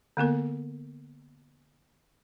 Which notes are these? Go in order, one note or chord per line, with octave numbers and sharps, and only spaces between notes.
D3 A#3 B3 A#4